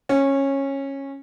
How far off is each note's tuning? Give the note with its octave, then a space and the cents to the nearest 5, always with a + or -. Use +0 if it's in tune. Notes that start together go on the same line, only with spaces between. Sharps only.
C#4 -15